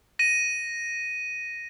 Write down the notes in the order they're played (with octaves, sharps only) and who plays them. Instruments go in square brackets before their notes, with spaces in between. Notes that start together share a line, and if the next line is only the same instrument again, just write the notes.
[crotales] A#6 D#7